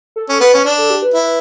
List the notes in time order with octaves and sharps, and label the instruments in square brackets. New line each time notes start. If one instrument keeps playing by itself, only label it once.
[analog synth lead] A4
[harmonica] C#4
[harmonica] B3 [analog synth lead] B4
[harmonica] C#4
D4
[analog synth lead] A4
G4
B4
[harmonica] E4